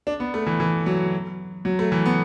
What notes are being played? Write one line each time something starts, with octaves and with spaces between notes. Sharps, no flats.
D4
B3
A3
E3
E3
F#3
F#3
A3
E3
B3